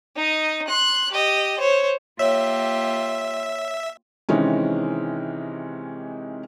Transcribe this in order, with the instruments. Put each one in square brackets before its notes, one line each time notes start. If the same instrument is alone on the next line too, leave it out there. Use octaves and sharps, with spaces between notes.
[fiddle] D#4 D#5
C6 F#6
G4 D#5
C5 C#5
[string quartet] A#3 F4 G4 [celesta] C#5 [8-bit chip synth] E5
[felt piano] C3 D#3 E3 G#3 C4 C#4